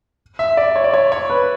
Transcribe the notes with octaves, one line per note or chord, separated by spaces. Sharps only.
E5
D5
C#5
D5
C#5
C#5
B4